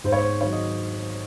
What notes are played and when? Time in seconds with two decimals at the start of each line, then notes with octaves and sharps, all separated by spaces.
0.04 G#2 C5
0.12 C#5
0.21 C5
0.41 D#3 F#3 C#5
0.52 D#5